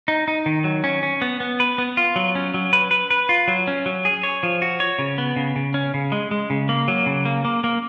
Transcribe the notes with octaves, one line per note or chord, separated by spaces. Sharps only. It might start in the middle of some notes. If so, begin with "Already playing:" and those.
D#4
D#4
D#3
F#3
C#4
C#4
B3
B3
B4
B3
F4
F#3
C#4
F#3
B4
B4
B4
F4
F#3
C#4
F#3
G#4
C#5
F3
F#4
C#5
C#3
B3
C#3
C#3
C#4
C#3
G#3
G#3
C#3
A#3
F#3
C#3
A#3
A#3
A#3